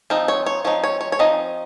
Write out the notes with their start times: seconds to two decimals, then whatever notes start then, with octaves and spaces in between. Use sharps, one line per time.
0.10 F3 C4 D#4
0.28 C#5
0.46 C#5
0.65 F3 C4 D#4 C#5
0.84 C#5
1.01 C#5
1.12 C#5
1.19 F3 C4 D#4 D#5